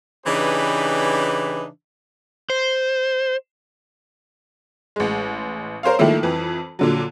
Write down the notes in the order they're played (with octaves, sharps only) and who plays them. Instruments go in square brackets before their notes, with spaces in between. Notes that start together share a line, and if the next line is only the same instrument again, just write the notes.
[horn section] C#3 E3 D4 D#4 G4 B4
[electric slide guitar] C5
[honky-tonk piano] A1 G#3
A#4 C5 C#5 F5
D#3 F3 A3 A#3 E4
F2 E3
A#2 D3 F#3